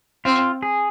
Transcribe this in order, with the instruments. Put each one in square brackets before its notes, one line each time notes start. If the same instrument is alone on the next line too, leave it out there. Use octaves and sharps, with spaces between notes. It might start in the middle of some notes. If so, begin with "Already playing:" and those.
[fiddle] C4 [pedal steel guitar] F4
[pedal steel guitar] G#4